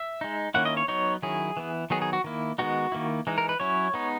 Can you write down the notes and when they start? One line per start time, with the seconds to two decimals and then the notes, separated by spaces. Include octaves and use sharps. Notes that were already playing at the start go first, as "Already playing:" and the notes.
Already playing: E5
0.21 G#3 D#4
0.54 D#3 A#3 C#4 E4 F#5
0.65 D#5
0.77 C#5
0.88 F#3 B3 D#4 C#5
1.22 D#3 F#3 C#4 E4 G#4
1.57 E3 B3 E4
1.90 D#3 F#3 B3 D#4 G#4
2.02 G#4
2.13 F#4
2.24 D#3 A#3 E4
2.58 D#3 G#3 B3 D#4 F#4
2.92 D#3 A#3 E4
3.27 E3 G#3 D#4
3.38 A#4
3.49 B4
3.60 F#3 C#4 E4 C#5
3.94 G#3 B3 D#4